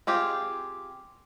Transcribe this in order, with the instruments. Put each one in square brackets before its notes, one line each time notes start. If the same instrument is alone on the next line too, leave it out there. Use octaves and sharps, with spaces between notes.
[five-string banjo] C4 F4 G4 G#4